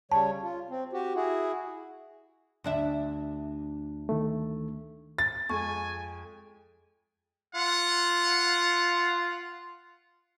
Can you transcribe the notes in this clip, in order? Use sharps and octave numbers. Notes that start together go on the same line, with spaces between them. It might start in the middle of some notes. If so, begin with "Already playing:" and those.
C#3 G3 C#5 A5
F4
C4
F#4 G4
E4 F#4 G#4
D2 D4 E5
D#3 A3
A6
F2 G#3 G#5 C#6
F4 F#5